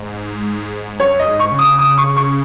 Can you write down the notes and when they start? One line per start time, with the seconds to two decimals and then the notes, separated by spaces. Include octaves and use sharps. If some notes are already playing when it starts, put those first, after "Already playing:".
Already playing: G#2
1.00 F#2 C#5
1.19 D#5
1.26 G#2
1.39 C#6
1.52 C#3
1.59 D#6
1.79 D#6
1.98 C#6
2.17 C#6